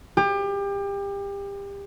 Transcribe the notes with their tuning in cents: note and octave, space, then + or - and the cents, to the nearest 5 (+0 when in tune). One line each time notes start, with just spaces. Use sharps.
G4 +30